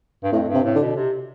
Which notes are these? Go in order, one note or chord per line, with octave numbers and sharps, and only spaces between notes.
G2
F2 A2
G2
C3
A2
D3
B2
C3